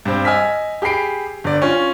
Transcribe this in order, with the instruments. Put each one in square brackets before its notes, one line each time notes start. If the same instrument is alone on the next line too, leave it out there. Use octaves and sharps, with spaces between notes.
[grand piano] G2 C4
D#5 G#5 E6 F6 B6
G4 G#4 B5 C7 D7
G1 D5
C#4 F4